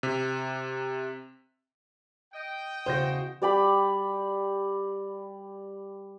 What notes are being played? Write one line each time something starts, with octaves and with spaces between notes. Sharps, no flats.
C3
D#5 G5
E2 C#3 F#4 C5 G6 A#6
G3 D5 G5 B5